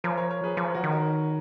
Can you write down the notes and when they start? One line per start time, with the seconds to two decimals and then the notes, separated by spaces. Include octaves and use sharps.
0.04 F3 A#4 C#5
0.17 A#4 C#5
0.30 A#4 C#5
0.44 G#4 B4
0.57 F3 A#4 C#5
0.74 F#4 A#4
0.84 D#3
0.92 F#4 A#4